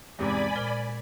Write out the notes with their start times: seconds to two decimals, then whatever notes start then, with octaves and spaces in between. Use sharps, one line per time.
0.19 E2 G#2 C3 G#3 D5 G#5 B5
0.55 A#2 C5 F6 G7